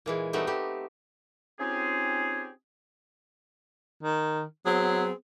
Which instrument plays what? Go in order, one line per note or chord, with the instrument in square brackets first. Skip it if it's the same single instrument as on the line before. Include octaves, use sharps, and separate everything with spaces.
[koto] A#2 E3 G#3
G3 A3 B3 C4 D#4
A3 G4
[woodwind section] C4 C#4 D#4 F4 G4 G#4
[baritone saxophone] D#3
[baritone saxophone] F#3 [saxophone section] B3 C4 G#4